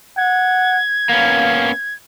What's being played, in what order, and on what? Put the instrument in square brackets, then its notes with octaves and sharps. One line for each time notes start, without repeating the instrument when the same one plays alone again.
[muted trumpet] F#5 [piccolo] G#6
[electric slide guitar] A#3 B3 C#4 [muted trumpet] F5